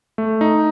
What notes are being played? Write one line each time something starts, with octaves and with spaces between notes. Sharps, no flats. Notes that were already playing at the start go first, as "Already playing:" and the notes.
A3
D#4